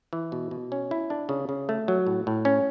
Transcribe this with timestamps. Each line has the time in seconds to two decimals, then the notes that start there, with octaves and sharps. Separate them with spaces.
0.13 E3
0.32 B2
0.51 B2
0.72 C#4
0.91 E4
1.10 D4
1.29 C#3
1.49 C#3
1.69 A3
1.88 F#3
2.07 A2
2.27 A2
2.45 C#4